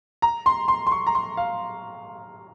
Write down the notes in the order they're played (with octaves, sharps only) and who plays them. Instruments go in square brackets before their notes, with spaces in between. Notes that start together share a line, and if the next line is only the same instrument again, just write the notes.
[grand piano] A#5
C6
C6
C6
C#6
A#5
C6
F5